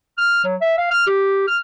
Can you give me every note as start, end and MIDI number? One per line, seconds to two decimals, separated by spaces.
0.18 0.44 89
0.44 0.55 54
0.61 0.73 76
0.78 0.87 77
0.91 1.03 89
1.07 1.48 67
1.48 1.57 89